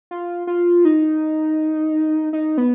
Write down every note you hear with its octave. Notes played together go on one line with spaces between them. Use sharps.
F4
F4
D#4
D#4
B3